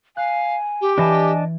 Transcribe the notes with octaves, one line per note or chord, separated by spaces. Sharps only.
F5 G#5 F#6
G4
E3 D4 D#5 G#5 A5 G#6